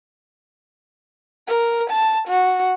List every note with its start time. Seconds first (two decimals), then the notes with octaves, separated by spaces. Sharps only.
1.47 A#4
1.90 A5
2.28 F#4